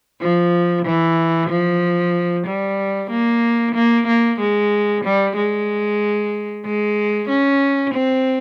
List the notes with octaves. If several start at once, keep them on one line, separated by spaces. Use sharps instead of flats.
F3
E3
F3
G3
A#3
A#3
A#3
G#3
G3
G#3
G#3
C#4
C4